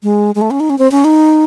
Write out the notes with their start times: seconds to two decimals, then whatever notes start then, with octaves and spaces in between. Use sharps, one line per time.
0.03 G#3
0.35 G#3
0.41 A3
0.51 C#4
0.60 D#4
0.70 C#4
0.79 C4
0.92 C#4
1.04 D#4